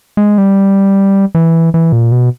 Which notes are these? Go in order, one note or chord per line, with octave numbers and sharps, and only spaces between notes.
G#3
G3
E3
E3
A#2
B2